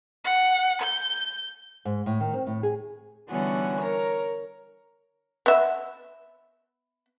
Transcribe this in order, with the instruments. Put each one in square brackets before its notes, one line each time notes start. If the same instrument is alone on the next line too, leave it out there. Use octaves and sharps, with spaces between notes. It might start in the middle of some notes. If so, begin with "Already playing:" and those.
[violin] F#5
G6
[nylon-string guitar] G#2
A2
D#3
C4
A2
G#4
[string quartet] D3 E3 G3 B3 C#4 F#4
A#4 C#5 A#5
[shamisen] B3 E5